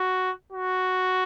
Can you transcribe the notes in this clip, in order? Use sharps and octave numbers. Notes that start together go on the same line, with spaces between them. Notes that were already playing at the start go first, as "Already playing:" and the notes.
Already playing: F#4
F#4